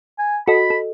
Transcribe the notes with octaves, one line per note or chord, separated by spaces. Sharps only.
G#5
F#4 A4 D#5 B5
A4